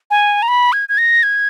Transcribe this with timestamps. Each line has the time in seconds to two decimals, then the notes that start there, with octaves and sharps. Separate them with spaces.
0.11 G#5
0.42 A#5
0.48 B5
0.73 G#6
0.89 G#6
0.98 A#6
1.23 G#6